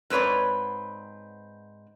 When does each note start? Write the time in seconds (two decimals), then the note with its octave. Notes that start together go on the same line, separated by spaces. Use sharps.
0.10 G#2 C4 B4 C#5 D5